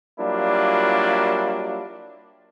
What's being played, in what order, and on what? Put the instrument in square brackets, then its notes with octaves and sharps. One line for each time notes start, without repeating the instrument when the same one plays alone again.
[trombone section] F#3 G3 A#3 D4 E4 F4